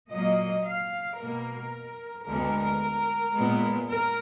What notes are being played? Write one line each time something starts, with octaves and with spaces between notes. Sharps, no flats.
A#2 F#3 A#3 D#5
F5
B2 A#3 A#4
D2 D3 G#3 B3 A#4
A#2 G#3 B3
A#4